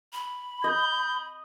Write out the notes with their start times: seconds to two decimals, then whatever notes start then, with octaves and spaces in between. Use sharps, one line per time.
0.13 B5
0.64 D#5 G6